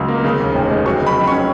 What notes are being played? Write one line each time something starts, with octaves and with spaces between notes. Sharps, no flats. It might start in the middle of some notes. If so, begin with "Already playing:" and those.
Already playing: C#2 C#3 F#3
A#3
C#3
D#2
F1
G#3
F#3 C#6
C#3 B5
F2
C#4 C#6